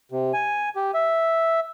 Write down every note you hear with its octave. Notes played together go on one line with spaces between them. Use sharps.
C3
G#5
G4
E5